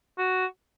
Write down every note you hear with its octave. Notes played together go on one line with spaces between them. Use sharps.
F#4